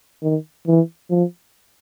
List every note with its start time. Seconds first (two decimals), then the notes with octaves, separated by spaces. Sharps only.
0.23 D#3
0.67 E3
1.10 F3